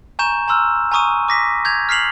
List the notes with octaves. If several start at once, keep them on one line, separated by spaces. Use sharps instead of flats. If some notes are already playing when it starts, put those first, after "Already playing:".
G#5 A#5 C#6 G6 E7
G#5 A#5 C6 E6 F6
G#5 A#5 C#6 D#6 D#7
D6 A#6 B6
G6 G#6 F7
F6 B6 C7 F7 F#7